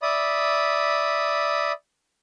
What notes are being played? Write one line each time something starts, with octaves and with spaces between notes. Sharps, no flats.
D5 E5 B5 D#6